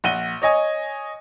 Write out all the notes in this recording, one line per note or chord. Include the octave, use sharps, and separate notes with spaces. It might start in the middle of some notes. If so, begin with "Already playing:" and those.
A#1 F#5 D#7 G7
C#5 D#5 G#5 D#6